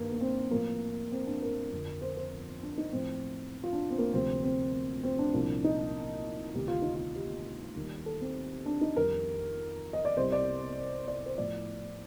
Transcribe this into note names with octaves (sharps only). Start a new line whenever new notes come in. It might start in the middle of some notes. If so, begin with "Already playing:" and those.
Already playing: G2 D#3 A#3
A#3
C4
A2 F3 A#3
C4
D4
A#4
F2 D3 F3
C5
C5
D4
D#4
A2 F3 C4
F4
D4
C4
A#3
D2 C3 F3 C4
C4
C4
D4
C2 A#2 F3
D#4
D2 C3 D#3 G4
F4
D#4
F4
G4
D#2 D#3 G3
A4
C4
D4
D#4
F2 D#3 G3 A#4
D#5
D5
C2 C3 G3 C5
D5
D5
C5
A2 F3 D5